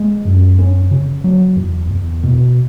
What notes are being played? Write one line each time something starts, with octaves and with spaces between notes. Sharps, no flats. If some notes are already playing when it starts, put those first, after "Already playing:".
Already playing: G#3
F#2
C#4
C#3
F#3
E2
E2
B2